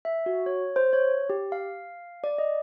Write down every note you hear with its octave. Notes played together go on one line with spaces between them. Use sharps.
E5
F#4
C#5
C5
C#5
G4
F5
D5
D#5